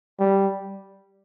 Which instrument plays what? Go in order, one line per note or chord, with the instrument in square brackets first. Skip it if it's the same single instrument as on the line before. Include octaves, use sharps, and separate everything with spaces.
[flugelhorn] G3